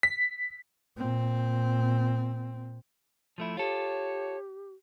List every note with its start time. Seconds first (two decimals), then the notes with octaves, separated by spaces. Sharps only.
0.03 B6
0.97 A#2 C4
3.38 F3 A3 E4
3.57 F4 G4 A4 C#5